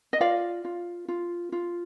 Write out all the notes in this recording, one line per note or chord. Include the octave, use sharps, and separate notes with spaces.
D#5
F4 D5 F5
F4
F4
F4